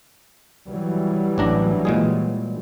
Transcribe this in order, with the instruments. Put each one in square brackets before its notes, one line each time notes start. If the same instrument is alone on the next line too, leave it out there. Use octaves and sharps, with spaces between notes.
[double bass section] E3 F#3 G3
[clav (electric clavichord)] A1 D4 A#5
A#2 G#3 G#4